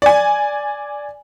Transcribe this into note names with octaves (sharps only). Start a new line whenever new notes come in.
D5 G#5